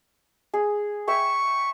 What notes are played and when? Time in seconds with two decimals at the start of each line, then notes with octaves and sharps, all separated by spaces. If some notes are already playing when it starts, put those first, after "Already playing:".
0.54 G#4
1.08 E5 G5 G#5 C#6